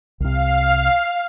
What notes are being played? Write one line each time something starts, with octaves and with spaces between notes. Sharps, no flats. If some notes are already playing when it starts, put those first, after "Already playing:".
C2 C3 F5